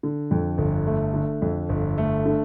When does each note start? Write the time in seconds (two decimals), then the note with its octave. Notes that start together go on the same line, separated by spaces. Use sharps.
0.03 D3
0.31 F2
0.58 G1
0.87 A3
1.14 D3
1.42 F2
1.69 G1
1.98 A3
2.26 D3